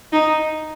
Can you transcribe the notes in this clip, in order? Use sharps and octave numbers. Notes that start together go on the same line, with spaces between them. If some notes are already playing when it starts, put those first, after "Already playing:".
D#4